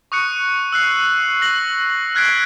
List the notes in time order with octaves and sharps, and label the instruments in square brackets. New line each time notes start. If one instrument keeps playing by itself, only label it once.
[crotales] C#6 D#6 F#6 C#7
E6 F#6 C7
A#6 F#7
F6 F#6 G#6 B6 C7 D7